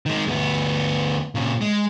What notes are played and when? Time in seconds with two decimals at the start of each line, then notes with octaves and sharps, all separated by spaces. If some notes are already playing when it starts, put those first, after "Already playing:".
0.06 D#3 G#3
0.27 D2 B3
1.35 A#2 C#3
1.61 G#3